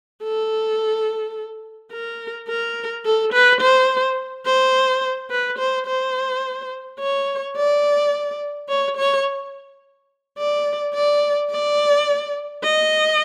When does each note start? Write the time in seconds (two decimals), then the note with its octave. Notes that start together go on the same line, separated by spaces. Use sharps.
0.23 A4
1.92 A#4
2.48 A#4
3.05 A4
3.33 B4
3.61 C5
4.46 C5
5.31 B4
5.59 C5
5.87 C5
7.00 C#5
7.56 D5
8.69 C#5
8.97 C#5
10.38 D5
10.94 D5
11.51 D5
12.64 D#5